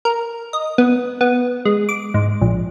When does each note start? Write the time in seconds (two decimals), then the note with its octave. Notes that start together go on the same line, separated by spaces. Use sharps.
0.05 A#4
0.53 D#5
0.78 B3
1.21 B3
1.65 G#3
1.89 D6
2.14 G#2
2.41 A#1